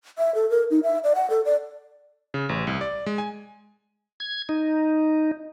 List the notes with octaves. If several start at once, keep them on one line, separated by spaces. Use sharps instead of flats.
E5
A4
A#4
D#4
E5
D5
F#5
A4
D5
C#3
A1
C2
D5
G#3
G#5
G#6
D#4